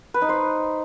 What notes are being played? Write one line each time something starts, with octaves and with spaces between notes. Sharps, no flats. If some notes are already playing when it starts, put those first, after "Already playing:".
B4
D#4
C5